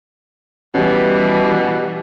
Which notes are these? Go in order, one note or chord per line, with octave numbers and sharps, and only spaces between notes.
B2 E3 G3 C#4 G4